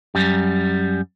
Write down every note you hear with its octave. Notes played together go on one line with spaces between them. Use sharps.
F#2 G3